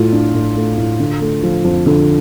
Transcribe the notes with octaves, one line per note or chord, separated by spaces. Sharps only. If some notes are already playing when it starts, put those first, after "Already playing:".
Already playing: A2 A3 F4
D4
A2
A3
A2
D3
A3
F3
F2
D3